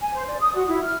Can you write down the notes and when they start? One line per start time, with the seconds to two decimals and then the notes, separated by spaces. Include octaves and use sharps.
0.01 G#5
0.14 C5
0.27 D5
0.41 D#6
0.55 F#4
0.68 E4
0.84 F6